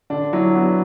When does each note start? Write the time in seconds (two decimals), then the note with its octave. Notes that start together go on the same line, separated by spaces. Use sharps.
0.10 D3 D4
0.33 F#3 E4
0.55 B3 F#4